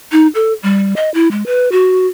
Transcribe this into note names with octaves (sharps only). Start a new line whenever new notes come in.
D#4
A4
G3
D#5
E4
G#3
B4
F#4